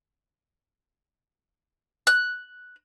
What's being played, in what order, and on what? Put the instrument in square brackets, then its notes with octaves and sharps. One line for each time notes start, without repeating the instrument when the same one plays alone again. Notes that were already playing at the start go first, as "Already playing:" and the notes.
[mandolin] F#6